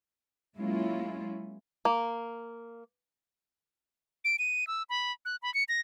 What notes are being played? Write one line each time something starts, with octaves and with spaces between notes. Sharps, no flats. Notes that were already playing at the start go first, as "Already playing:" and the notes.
F#3 G#3 A#3 C#4 E4 F4
A#3
D7
D#7
E6
B5
F#6
B5
C#7
A#6